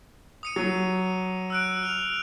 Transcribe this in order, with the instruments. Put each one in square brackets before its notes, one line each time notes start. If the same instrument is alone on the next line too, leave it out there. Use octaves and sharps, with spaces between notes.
[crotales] D#6 C#7 D#7
[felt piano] F#3
[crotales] E6 F#6 D7
F6 F7